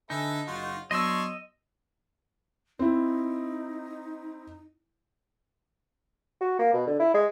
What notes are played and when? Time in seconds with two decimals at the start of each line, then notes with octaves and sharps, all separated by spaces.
0.10 D3 D#4 A4 B4 E5 G#5
0.47 F#1 F4 F#4
0.91 F#3 B3 D4 C#5 D#5 C6 E6
2.79 C4 D#4 E4
6.41 F#4
6.59 A#3
6.74 B2
6.87 D3
7.00 E4
7.14 G#3